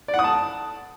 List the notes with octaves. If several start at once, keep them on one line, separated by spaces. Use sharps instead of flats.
D5
F#5
D#6
A5